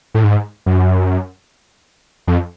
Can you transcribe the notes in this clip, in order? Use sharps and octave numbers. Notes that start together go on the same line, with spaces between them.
A2
G#2
F#2
F2